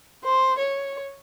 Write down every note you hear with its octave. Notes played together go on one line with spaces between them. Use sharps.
C5
C#5